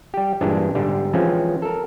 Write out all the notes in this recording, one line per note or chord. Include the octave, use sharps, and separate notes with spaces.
G3 G4
G2 A#2 E3 G#3 D4
G#2 D3 G3
E3 F3 G#3 C4 C#4
A4 A#4